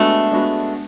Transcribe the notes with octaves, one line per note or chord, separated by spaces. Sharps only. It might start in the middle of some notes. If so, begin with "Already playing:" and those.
Already playing: G#3 A3 B3 D4 F#4
G#3 B3 D4 F#4